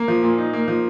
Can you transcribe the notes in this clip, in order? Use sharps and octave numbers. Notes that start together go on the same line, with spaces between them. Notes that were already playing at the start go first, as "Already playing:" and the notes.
Already playing: A#3
F3
A#2
D#4
A#3
F3